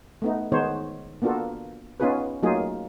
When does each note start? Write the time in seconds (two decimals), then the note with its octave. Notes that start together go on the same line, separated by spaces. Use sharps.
0.22 A3 B3 D#4
0.52 D#3 G#3 B3 D#4 C5 C#5
1.22 A#3 B3 D4 F4 F#4 A4
2.00 B3 C#4 D#4 F4 G#4 B4
2.43 F#3 A3 A#3 D#4 F4 G#4